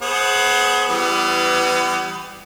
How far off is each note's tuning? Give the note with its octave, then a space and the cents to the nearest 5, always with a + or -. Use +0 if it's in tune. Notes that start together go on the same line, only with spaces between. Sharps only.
B3 +0 G#4 +25 C5 +30
E3 +30 G3 +0 B3 +25